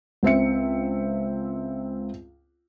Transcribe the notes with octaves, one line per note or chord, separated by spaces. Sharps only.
C#2 C4 E5 C#7